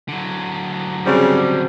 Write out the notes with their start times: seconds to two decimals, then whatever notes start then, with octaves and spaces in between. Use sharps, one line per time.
0.09 D3 F#3
1.06 C#3 G3 C4 F#4 C5